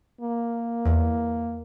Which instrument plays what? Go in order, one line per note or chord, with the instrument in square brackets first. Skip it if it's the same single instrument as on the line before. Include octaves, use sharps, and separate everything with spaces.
[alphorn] A#3
[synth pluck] E2